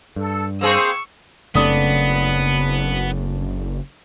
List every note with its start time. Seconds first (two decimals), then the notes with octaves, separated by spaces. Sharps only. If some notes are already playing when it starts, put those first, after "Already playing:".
0.16 G2 A4
0.61 A#3 C4 G#4 C5 C#6 E6
1.55 F#1 C#3 A3 B3 C4 D4 D#6